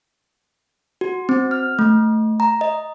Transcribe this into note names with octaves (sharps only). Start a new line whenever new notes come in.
F#4
C4
F6
A3
A#5
D#5